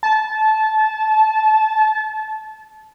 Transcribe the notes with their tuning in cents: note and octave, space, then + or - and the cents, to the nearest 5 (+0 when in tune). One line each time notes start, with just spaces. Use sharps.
A5 -20